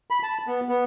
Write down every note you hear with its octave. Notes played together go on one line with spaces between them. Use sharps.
B5
A5
B3
B3